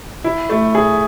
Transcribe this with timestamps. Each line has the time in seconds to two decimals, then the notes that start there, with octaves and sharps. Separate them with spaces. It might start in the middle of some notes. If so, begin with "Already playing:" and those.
0.24 E4
0.49 A3
0.75 G#4